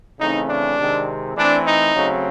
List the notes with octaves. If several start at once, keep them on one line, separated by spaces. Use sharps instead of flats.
C#3 E3 A3 C4 D#4
D4
C3 D#3 G#3 C4
E3 A3 C4 D4
D#4
C#3 F#3 A3 C4